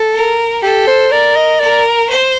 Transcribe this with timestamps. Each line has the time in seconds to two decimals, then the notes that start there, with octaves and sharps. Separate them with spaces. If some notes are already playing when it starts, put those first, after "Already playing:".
Already playing: A4
0.14 A#4
0.63 G4 A4
0.87 C5
1.11 A#4 D5
1.36 D#5
1.60 A#4 D5
2.09 C5